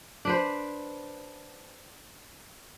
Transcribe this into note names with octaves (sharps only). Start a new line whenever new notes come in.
D4 B4 C5